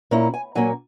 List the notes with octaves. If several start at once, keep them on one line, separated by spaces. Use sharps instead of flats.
A#2 A#3 C#4 E4
G#5
A#2 F#3 A#3 C#4 G#5